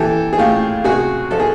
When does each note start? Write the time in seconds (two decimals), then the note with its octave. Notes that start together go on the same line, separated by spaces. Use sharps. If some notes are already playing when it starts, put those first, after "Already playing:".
Already playing: E3 G4 A4
0.33 G#4
0.38 A2 F4 G4
0.84 C3 F#4 G#4
1.31 F3 A4
1.40 G#4